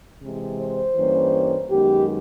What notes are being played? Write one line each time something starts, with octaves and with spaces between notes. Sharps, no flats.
C3 E3 G#3
C5
G2 E3 G3 A#3 C#4
F#2 D#3 G#3 B3 G4